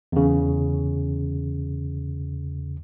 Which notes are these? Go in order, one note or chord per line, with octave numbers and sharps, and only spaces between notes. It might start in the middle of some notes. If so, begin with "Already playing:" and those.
E2 C#3